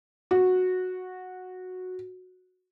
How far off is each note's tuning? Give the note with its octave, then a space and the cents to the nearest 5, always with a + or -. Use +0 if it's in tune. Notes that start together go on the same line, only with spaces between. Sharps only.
F#4 -10